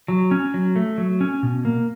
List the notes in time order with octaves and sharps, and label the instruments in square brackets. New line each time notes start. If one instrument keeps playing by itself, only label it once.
[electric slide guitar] F#3
C#4
F#3
A3
F#3
C#4
B2
A#3